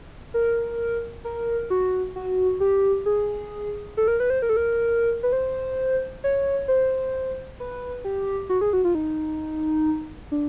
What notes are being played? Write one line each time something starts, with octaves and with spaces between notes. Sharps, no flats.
A#4
A#4
F#4
F#4
G4
G#4
A4
A#4
B4
C5
A#4
A4
A#4
B4
C5
C#5
C5
B4
G4
F#4
G#4
F#4
F4
D#4
D4